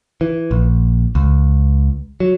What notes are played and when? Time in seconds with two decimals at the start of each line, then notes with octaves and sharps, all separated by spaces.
0.21 E3
0.51 A#1
1.15 C#2
2.20 F#3